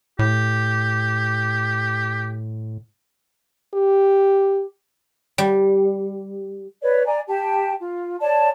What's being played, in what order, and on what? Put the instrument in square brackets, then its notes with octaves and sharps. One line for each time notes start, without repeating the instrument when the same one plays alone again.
[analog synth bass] A2 [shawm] G4
[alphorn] G4
[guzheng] G3
[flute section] B4 C#5 D5
D5 G#5 A#5
G4 G5 A5
F4
C#5 D5 A5